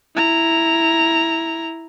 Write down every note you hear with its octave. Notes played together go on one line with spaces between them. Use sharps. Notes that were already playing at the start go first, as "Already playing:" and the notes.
E4 A#5